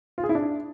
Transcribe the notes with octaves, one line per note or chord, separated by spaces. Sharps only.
F4
G#4
E4
D4